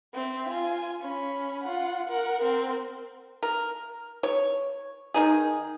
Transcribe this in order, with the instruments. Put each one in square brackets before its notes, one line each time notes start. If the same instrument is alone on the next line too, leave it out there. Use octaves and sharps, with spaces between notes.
[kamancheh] C4 E5
F4 G#5
C#4 B5
F4 F#5
A#4 F#5
C4 A#4
[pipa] A#4
C#5
D#3 D#4 G#4